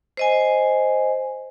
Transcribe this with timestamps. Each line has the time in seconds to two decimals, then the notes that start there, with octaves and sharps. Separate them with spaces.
0.17 C5 D#5 G#5